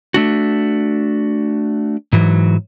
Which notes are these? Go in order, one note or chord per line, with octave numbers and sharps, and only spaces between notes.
A3 D4 F#4
G#2 E3 F#3